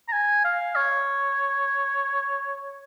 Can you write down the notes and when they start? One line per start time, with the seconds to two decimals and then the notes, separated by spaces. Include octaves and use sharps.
0.08 A#5
0.12 G#5
0.44 F5
0.76 C#5